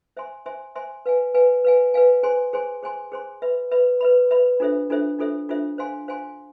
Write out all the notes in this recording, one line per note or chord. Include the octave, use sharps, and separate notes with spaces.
C5 E5 G#5 C6
C5 E5 G#5 C6
C5 E5 G#5 C6
B4 F5 G#5
B4 F5 G#5
B4 F5 G#5
B4 F5 G#5
G#4 C5 G#5 C6
G#4 C5 G#5 C6
G#4 C5 G#5 C6
G#4 C5 G#5 C6
B4 E5 B5
B4 E5 B5
B4 E5 B5
B4 E5 B5
D4 F4 A4 C5 E5
D4 F4 A4 C5 E5
D4 F4 A4 C5 E5
D4 F4 A4 C5 E5
C5 F5 G#5 C6
C5 F5 G#5 C6